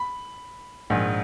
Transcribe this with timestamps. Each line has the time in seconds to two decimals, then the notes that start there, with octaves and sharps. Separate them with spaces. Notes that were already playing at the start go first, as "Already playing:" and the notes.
Already playing: B5
0.90 A#1 G#2 D#3